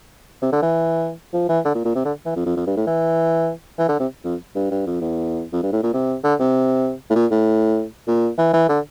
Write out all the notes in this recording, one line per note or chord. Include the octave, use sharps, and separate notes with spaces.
C3
D3
E3
F3
E3
D3
A#2
A#2
C3
D3
E3
F2
F2
F2
G2
A2
E3
E3
D3
C3
F2
G2
G2
F2
E2
F2
G2
A2
A#2
C3
D3
C3
A2
A#2
A2
A#2
E3
E3
D3